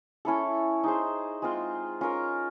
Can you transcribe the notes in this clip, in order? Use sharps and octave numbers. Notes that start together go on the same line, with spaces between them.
C#4 E4 A4
D#4 G#4 C5
G#3 C4 F4
C#4 F4 A#4